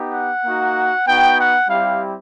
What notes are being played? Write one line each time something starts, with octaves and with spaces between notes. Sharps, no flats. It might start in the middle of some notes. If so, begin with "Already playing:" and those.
Already playing: B3 D#4 G4
F#5
A#3 D#4 F#4
B3 D#4 F#4 G5
F#5
G3 C4 E4 G4 F5